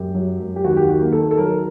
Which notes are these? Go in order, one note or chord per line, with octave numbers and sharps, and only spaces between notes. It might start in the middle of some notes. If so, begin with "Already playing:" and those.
Already playing: F#2 G4
F#3
F#2
G4
D#2 F#4
G4
D#3 F#4
A#3
D#3 A4
A4
F#3 A#4